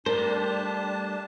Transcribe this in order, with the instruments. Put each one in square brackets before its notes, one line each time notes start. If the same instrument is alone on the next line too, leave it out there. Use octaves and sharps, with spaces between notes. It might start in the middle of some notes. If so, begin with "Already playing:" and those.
[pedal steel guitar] G3 A3 C5 [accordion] D4 A5 [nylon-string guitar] A#4